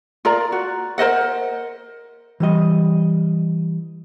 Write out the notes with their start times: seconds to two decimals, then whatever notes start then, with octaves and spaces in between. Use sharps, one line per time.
0.25 F4 A#4 D5 A#5
0.52 F#4
0.98 A#4 C5 D#5 F#5
2.40 E3 G3 D#5